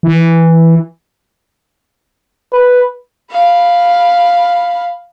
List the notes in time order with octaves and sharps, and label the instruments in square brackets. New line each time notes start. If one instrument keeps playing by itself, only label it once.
[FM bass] E3
[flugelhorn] B4
[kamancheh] F5 B5